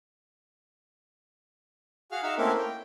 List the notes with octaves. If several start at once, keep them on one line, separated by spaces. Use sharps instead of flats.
F#4 G#4 F5 F6
D#4 F#4 E5 F5 E6
A3 A#3 C4 C#4 E4 A#4
G5